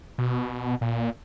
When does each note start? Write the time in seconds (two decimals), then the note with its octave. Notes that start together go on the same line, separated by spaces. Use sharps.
0.18 B2
0.81 A#2